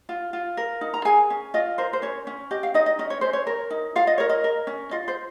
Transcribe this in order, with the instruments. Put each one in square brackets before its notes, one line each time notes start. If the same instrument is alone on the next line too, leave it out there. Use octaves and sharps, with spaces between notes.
[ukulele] F4
F4
A#4
D#4
A#5
G#4 G#5
C#4
F4 D#5
A#4 C5
C5
C#4 C#5
C#4
G4 D#5
F5
D#4 D#5
D#5
C#4 D#5
C#5
C#4 C5
C#5
A#4
D#4
F4 F5
D#5
A#4 C#5
D#5
A#4
C#4
F4 D#5
C5